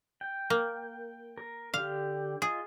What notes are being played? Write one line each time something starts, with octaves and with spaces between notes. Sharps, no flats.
G5
A#3
A#4
D3 G4 F5
F4 G#4 D#5